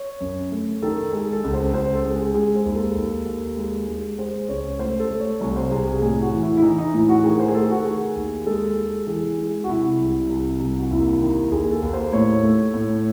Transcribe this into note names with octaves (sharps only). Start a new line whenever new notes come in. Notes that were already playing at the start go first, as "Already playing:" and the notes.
Already playing: C#5
F#2
A3
D#3 A4
G#3 G#4
A4
C#2
C5
C#2 C5
A4
G#3
G#4
G#3 G#4
C5
D#2
A4
D#2
D#2
G#3
G#3
G#3 C5
C#2 C#5
A3 C5
A4
A3
C#5
C2 C#5
C5
C2 G#4
G#4
A2 G#4
F#4
E3
E4
E4
E3 D#4
D#4
A2 E4
F#4
D#3 G#4
C5
G#4
A3 A4
F#4
D#3 G#4
D#2
G#3 A4
G#3
E3 G#4
G#3
F#4
C3 E4
C2
C2
C2
F#4
D#2 E4
D#3
D#2 G#4
A4
D#2
C5
A2 C#5
A3
A2